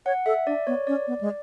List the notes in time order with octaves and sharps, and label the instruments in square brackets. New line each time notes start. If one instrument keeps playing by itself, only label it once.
[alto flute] C#5 [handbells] F#5
[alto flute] A4 [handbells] E5
[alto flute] D4 [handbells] D5
[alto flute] B3 [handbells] C#5
[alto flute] C#4 [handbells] D5
[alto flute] B3
G#3